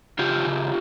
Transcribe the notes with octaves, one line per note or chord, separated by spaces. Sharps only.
C#3 F4 G4
C#3